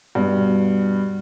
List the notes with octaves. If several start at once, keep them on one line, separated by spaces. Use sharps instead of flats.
G2 B2